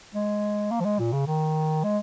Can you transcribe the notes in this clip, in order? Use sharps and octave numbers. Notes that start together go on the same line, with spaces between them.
G#3
A#3
F3
G#3
A#2
C#3
D#3
G#3